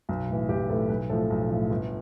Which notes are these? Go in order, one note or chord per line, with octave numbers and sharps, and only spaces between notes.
B1
A2 E3
B1 G4
A2 E3 A4
B1 B4
A2 F3 A4
B1
A2 F3
G1